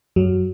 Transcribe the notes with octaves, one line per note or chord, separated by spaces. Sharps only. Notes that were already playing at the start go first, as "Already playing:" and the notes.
F#2 F#3